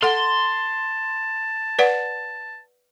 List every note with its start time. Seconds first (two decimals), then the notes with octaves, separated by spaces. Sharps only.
0.03 A4 F#5 A5 C6
1.79 B4 D5 F#5